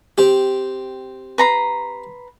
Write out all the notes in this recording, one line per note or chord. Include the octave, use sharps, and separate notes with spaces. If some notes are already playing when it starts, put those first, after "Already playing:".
C4 G4
B4 A#5 C6